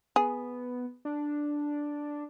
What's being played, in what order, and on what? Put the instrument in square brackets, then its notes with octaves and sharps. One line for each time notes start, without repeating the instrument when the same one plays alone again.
[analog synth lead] B3 [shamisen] G#4
[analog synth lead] D4